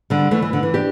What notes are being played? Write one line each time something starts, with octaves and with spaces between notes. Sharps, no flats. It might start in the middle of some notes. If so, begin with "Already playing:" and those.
D3 G3
E3 A3
E3
D3
E3
D4 G4